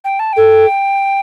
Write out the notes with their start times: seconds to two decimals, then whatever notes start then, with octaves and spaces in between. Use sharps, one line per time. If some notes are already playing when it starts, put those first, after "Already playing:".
0.04 G5
0.19 A5
0.33 A4 G5